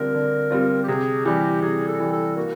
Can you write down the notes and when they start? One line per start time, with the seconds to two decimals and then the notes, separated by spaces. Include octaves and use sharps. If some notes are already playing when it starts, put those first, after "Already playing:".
Already playing: D3 G3 C4 F4 A#4
0.14 D3
0.51 G3 C4 F4
0.83 G4
0.88 C3 G#4
1.25 E3 G3 G4
1.62 C3 G#4
1.87 A4
2.00 E3 G3
2.12 A4
2.37 A#3 F#4